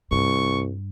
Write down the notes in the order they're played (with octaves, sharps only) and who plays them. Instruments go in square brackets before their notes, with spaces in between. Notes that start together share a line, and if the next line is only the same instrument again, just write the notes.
[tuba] C2 [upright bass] G2 [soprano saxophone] C#6